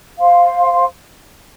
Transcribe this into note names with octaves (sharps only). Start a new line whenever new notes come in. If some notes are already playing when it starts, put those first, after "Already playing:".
C5 F5 C6